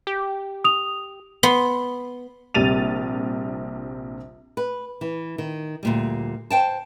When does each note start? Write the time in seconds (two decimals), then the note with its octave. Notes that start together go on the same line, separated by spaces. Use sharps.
0.07 G4
0.64 D#6 F7
1.43 B3 C6
2.54 A#1 C3 G3 A6 D#7 F7
4.57 B4
5.01 E3
5.38 D#3
5.83 D2 A#2 G3
6.51 C5 G5 A5